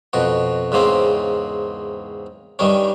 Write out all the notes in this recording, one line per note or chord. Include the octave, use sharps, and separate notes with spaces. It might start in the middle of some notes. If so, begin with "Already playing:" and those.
F2 B2 F#4
E2 G#2 C#3 A#3 C4
G2 D#3 G3 C#4